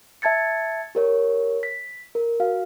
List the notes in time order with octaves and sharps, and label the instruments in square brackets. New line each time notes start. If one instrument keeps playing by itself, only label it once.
[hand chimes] E5 A5 G#6 A6 C#7
G4 A#4 C#5
B6
A#4
F#4 F5